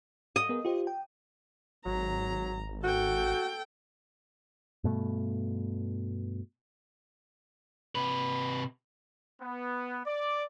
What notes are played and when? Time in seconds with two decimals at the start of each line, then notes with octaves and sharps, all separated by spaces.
0.36 D#5
0.49 B3 G#4 A#4
0.65 F4 G4 C5
0.87 G5
1.86 G#1 F#3 A#5
2.84 F#4 A4 G5
4.84 G2 B2 A3
7.95 C3 B4
9.41 B3
10.06 D5